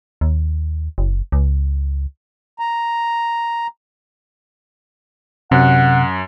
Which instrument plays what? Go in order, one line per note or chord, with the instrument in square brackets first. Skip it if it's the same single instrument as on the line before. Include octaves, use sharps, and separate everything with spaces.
[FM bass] D#2
F#1
C#2
[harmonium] A#5
[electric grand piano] F#2 [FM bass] C3 [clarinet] F#5